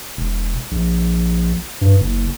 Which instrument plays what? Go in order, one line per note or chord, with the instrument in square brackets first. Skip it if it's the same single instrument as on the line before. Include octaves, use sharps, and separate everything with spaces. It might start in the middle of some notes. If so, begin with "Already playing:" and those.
[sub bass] E1
A#1
G2
F#1